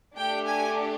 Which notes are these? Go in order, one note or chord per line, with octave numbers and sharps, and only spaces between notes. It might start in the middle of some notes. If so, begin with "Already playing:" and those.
A3 D4 G4 G5
G#5